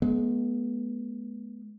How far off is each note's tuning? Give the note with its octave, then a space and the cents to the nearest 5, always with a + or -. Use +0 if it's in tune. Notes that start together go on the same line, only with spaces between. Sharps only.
G#3 +35 B3 -25